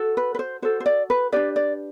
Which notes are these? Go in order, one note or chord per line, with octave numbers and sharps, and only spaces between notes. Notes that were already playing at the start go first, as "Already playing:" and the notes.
Already playing: F#4 A4
B4
B4
C5
F#4 A4 C5
C5
D5
B4
D4 G4 B4 D5
D5